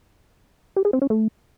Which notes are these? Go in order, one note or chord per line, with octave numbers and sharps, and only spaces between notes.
G4
G#4
C4
C#4
A3